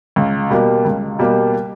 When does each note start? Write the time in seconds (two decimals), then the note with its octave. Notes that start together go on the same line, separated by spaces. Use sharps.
0.16 C#2
0.50 B2 G3 A#3
0.85 C#2
1.19 B2 G3 A#3